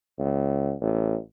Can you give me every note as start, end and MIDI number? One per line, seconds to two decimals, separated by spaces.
0.19 0.73 37
0.81 1.16 33